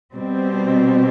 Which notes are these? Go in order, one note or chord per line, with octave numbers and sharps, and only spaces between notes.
B2 G3 C4